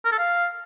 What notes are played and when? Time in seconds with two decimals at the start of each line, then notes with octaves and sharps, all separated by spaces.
0.05 A#4
0.12 A4
0.19 F5